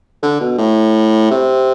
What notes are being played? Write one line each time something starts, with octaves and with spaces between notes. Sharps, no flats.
D3
B2
A2
C3